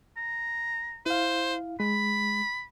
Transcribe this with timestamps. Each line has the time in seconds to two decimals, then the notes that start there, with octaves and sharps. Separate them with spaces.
0.17 A#5
1.06 E4 C5 F5
1.80 G#3 B5